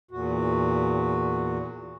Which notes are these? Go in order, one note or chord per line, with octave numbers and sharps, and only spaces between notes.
E2 A#2 F#4